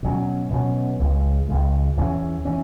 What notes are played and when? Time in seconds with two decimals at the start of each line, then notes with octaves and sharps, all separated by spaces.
0.03 B2 F#3 C#4
0.50 B2 F#3 C#4
0.99 C#2 C#3 G#3
1.49 C#2 C#3 G#3
1.97 E2 E3 C#4
2.45 E3 C#4